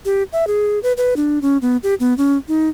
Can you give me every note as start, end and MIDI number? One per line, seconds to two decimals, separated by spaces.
0.05 0.23 67
0.32 0.47 76
0.47 0.79 68
0.83 0.93 71
0.97 1.14 71
1.16 1.39 62
1.42 1.58 61
1.62 1.77 59
1.83 1.95 67
2.00 2.16 59
2.18 2.37 61
2.48 2.69 63